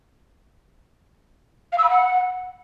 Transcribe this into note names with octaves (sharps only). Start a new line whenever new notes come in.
F5
E6
B5
F#5